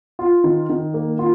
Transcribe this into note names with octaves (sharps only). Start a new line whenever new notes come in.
F4
D#3
D#3
A#3
F4